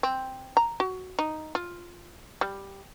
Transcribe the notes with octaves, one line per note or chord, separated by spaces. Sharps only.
C4
A#5
F#4
D#4
F4
G3